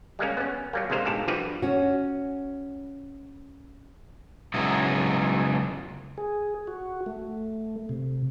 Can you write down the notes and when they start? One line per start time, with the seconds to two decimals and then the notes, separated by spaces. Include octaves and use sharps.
0.19 G3 G#3 A#3 C#4
0.37 B3 C#4
0.73 F#3 G3 A#3
0.90 D2 C3 G#3 A#3 C5
1.05 G#2 B2 G4 A4 F5
1.28 D3 E3 F3 G3 F#4 B4
1.62 C#4 F#4
4.54 C#3 F#3 G#3 B3 D#4 E4
6.18 G#4
6.67 F#4
7.06 A3
7.89 C3